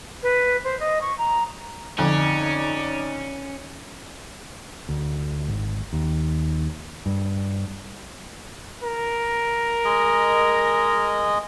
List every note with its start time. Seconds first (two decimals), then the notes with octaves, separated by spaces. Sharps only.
0.22 B4
0.64 C5
0.79 D#5
1.01 C#6
1.18 A#5
1.98 F2 D3 C#4 D#4 D5
4.89 D2
5.48 G#1
5.93 D#2
7.06 G2
8.83 A#4
9.85 G#3 D#5